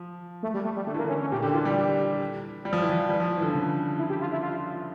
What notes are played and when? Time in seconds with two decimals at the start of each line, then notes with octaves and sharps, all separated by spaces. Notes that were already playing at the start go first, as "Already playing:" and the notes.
Already playing: F3
0.43 A3
0.54 G3
0.65 A3
0.76 G3
0.87 D3 A3
0.94 E3
0.98 A#3
1.03 D3
1.09 C#4
1.21 C#4
1.32 A#2 G4
1.42 D3 G4
1.54 E3 F4
1.64 G3 G4
1.75 G4
2.65 G3
2.73 F3
2.82 E3
2.90 F3
3.09 G3
3.20 F3
3.38 E3
3.42 D3
3.54 C#3
3.99 E4
4.10 G4
4.21 F4
4.32 E4
4.42 F4